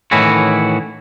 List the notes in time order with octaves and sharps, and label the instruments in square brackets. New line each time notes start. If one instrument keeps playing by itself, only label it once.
[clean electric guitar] A2 D#3 E3 C#4 E4 F#4